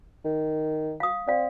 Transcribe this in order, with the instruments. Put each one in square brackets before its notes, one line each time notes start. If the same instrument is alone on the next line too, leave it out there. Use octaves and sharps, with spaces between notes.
[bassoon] D#3
[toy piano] F5 D#6
[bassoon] C4 [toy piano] D5 F5